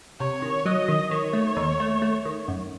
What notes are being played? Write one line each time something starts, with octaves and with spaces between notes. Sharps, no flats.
C3 C#5
D#3
F#3 D#5
D#3
D#3 C#5
A3
D#2
A3
A3
D#3
F#2